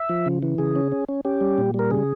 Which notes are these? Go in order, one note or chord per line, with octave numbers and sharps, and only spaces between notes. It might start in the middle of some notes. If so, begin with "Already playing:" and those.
Already playing: E5
F3
C#3
E3
C#3 G#4
C#4
C#4
C#4
C#4 G4
G3
A#2
G3 A#4
C#3 G#4